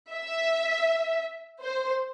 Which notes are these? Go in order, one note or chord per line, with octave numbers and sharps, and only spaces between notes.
E5
C5